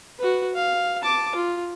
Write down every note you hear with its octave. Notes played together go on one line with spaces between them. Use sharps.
F#4 B4
F5
A5 D6
F4